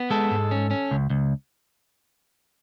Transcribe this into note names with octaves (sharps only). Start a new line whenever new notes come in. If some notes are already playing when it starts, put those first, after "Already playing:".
Already playing: B3
G#3 A4
G#2
C#4
C#4
C#2
C#2